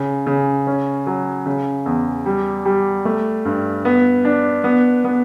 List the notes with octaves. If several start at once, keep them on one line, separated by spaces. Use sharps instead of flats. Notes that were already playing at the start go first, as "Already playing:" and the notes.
Already playing: C#3
C#3
C#4
F#3
C#3
E2
G3
G3
A3
G2
B3
D4
B3
B3